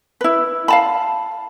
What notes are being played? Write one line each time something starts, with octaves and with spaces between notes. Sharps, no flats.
E4 B4
F5 A5 B5